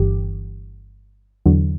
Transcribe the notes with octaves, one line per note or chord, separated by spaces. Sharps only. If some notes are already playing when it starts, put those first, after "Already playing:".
Already playing: G1 G2 E3 G4
E2 D3 F#3